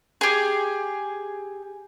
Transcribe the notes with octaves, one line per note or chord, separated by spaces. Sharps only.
G4 G#4